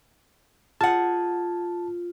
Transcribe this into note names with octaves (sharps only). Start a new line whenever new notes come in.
F4 G#4 F#5 A5